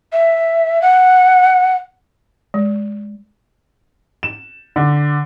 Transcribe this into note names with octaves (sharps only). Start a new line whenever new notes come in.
E5
F#5
G#3
E7
D3